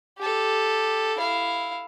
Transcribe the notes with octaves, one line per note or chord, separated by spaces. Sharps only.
G4 A4
E4 F5